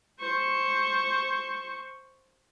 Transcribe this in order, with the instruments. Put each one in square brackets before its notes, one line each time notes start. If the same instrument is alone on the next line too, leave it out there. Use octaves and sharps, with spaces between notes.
[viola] C5 C#6